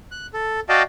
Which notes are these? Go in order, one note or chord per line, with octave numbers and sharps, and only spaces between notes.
F#6
A4
F#4 D5 D#5 F5 G5 A5